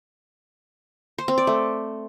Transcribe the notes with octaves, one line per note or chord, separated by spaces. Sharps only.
C5
C4
D5
A3